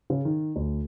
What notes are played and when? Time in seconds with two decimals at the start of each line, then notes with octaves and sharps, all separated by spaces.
0.10 C#3
0.25 D#3
0.56 D2